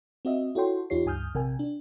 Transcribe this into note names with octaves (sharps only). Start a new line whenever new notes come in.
C4 F#4 D#5 E5
E4 F#4 A4 C#5 G5 C6
E2 D#4 F4 G4 C#5 C7
C#2 G2 G#5 D#6 F6 G6
A#1 C3 A#4 G5 G#5
D4